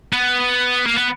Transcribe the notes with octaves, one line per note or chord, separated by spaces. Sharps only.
B3
A#3
B3